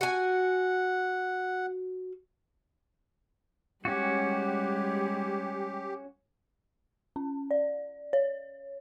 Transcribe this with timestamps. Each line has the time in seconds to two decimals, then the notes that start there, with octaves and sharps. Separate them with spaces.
0.01 F#4 F#5 G#5
3.85 G3 G#3 C#4 F#4 G4
7.16 C#4
7.51 D5
8.13 C#5